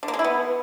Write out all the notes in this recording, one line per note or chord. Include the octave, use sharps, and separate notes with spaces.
D3
A#3
G#3
E4
B3